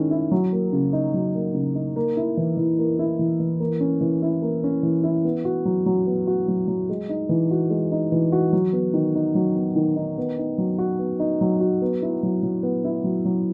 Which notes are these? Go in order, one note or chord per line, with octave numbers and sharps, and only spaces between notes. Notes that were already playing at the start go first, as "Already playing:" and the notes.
Already playing: D#3 G#3 C#4 E4
E4
F#3
A#3
C#3
D#4
F#3
A#3
C#3
D#4
A#3
E4
E3
E3
A#3
E4
E3
E3
A#3
C#4
E3
E4
A#3
C#4
E3
E4
B3
F#4
F#3
F#3
B3
F#4
F#3
F#3
G#3
D#4
E3
F#4
G#3
D#4
E3
F#4
F#3
B3
D#3
D#4
F#3
B3
D#3
D#4
B3
D#4
F#3
F#4
B3
D#4
F#3
F#4
B3
E4
F#3
F#3
B3
E4
F#3
F#3